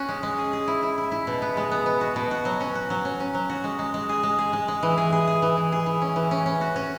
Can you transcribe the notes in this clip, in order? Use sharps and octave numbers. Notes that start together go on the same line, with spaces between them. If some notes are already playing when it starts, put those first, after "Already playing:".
Already playing: C#4 F#4
G#3
G#3
G#4
G#4
E4
E4
E4
E4
B2
B3
G#3
B3
B3
F#4
B2
F#4
F#3
C#4
F#4
F#3
C#4
C#4
F#3
F#4
G#3
G#3
G#3
G#4
G#3
G#4
G#3
G#3
E3
G#4
G#4
G#4
E3
E3
G#4
E3
C#4
E3
C#4
C#4
F#4
C#4